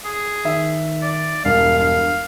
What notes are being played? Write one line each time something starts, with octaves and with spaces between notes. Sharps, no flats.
G#4
D#3 E5
D5
E1 G2 F5
F5